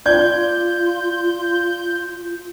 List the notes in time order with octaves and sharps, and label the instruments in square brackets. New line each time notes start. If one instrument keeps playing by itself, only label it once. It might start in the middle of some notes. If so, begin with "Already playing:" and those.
[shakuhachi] F4 [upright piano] D5 G#6 [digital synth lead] G6